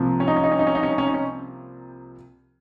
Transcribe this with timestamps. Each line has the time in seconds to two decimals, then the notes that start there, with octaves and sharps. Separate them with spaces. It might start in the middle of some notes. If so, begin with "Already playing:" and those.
Already playing: C2 C3 F3 A#3
0.20 C#4
0.27 D#4
0.36 C#4
0.44 D#4
0.52 C#4
0.59 D#4
0.67 C#4
0.75 D#4
0.83 C#4
0.90 D#4
0.98 C#4
1.07 D#4
1.14 C#4